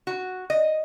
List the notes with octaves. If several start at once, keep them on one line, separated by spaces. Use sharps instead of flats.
F#4
D#5